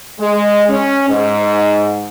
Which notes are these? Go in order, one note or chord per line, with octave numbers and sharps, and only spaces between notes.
G#3
C#4
G#2